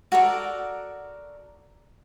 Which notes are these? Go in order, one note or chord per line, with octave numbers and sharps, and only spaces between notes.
F#4 A4 A#4 D5